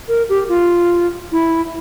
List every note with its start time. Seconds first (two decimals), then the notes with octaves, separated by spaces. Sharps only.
0.08 A#4
0.29 G4
0.49 F4
1.32 E4